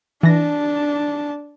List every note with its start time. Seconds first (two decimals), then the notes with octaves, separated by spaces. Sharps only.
0.23 E3 D4 A5 A#6